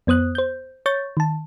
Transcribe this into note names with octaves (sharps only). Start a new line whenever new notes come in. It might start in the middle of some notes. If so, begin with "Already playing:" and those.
F2 B3 C5 D#6 F#6
C5 G6
C#5 C#6 G6 A6
D#3 A5